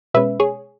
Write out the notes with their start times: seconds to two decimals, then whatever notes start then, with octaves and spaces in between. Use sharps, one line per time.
0.14 B2 G#3 C#4 B4 E5
0.40 G#4 C#5